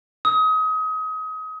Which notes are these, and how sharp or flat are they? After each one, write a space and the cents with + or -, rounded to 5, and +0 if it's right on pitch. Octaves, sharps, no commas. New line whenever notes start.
D#6 +30